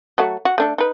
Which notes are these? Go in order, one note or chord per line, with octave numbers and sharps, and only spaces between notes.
F#3 A3 F#4
F#4
A3 D4 A4
D#4 B4